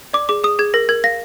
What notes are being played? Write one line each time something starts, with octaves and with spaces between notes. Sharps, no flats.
D5 D6
G#4 D6
G#4 D#6
G#4 G#6
A#4 A#6
A#4 G#6
F5 A#6